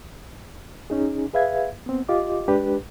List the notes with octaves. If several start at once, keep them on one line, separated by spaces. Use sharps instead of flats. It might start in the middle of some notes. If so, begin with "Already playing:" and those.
C#4 D#4 G#4
G#4 B4 E5 F5 G#6
B3 C4
F4 G4 D#5 D6
G#3 D4 G4 B4